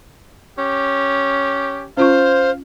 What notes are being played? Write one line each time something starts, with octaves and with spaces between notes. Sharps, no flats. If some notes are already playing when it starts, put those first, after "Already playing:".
C#4 G4
C#4 F4 C5 F5 C#6